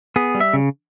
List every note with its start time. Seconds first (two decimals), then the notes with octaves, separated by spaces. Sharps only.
0.16 B3 G#4
0.35 G3
0.40 E5
0.53 C#3